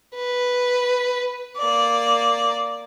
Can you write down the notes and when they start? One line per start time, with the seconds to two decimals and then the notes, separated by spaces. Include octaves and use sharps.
0.15 B4
1.58 A#3 D5